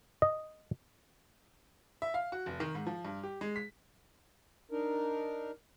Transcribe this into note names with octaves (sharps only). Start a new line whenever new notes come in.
D#5
E5
F5
F#4
F1
D#3
G#2
F3
G2
G4
G#3
B6
D4 D#4 A#4